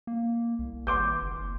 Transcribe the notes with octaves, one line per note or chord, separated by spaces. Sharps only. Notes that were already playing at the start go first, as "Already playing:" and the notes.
A#3
C2
G#1 C6 D6 G6
F#1